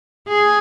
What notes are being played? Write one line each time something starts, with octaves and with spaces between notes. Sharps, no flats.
G#4